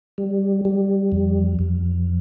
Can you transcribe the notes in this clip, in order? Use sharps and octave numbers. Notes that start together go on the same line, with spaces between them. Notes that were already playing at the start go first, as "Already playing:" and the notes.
G3
G3
F2
F2